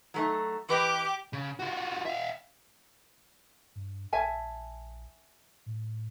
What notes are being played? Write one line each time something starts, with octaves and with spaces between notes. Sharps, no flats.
F#3 A3 D#4
E3 G4 B4 D#5 D6
C#3
F4 F#4
E5 F5
G2
A#1 E5 G#5 A5
A2